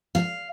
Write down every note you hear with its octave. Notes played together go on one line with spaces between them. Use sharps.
F5